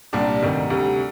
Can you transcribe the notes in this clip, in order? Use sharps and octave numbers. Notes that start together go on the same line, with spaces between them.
C2 A#2 G3 D4 G4
D2 C3 D#3 G3
D2 C3 G3